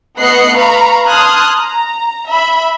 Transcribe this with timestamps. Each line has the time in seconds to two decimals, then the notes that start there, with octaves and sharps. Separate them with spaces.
0.19 A3 B3 D#5 F#6 C7 C#7
0.57 B4 F5 A#5 B5 C#6
1.08 A5 C6 D#6 F6 F#6 G#6
1.58 A#5
2.30 E5 B5